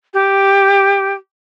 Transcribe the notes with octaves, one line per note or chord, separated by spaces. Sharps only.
G4